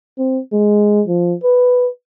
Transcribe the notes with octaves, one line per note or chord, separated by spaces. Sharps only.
C4
G#3
F3
B4